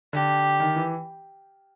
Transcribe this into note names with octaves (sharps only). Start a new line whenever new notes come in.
D3 G4
D#3
E3